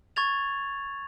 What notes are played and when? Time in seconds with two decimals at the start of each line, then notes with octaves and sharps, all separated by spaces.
0.16 C#6 G#6 A6 F7